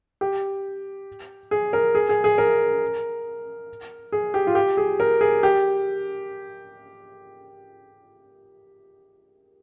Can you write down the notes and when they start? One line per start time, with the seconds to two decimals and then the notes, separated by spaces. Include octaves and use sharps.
0.21 G4
1.51 G#4
1.73 A#4
1.95 G#4
2.09 G#4
2.24 G#4
2.38 A#4
4.12 G#4
4.34 G4
4.47 F4
4.55 G4
4.77 G#4
5.00 A#4
5.21 G#4
5.43 G4